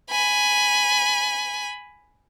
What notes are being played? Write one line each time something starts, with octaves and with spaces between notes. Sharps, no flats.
G#5 B5